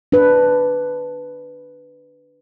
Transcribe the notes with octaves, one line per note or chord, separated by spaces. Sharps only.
D4 B4